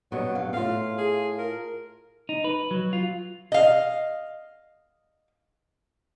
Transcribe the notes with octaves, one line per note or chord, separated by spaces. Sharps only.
G2 B2 F#3
F5
A2 F4 F5
G#4
A#4
D#4
B4
F#3
F4
D#5 F5